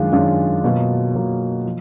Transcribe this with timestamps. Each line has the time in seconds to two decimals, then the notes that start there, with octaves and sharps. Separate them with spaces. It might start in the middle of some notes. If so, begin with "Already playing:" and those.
Already playing: F#2 D#3 G#3 D4 F4
0.12 F#2 D#3 G#3 D4 F4
0.64 B2 F#3 A#3 F4
1.15 B2 F#3 A#3 F4
1.65 F3